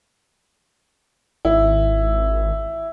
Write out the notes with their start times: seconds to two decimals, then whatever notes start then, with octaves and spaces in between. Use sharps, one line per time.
1.45 G#1 E4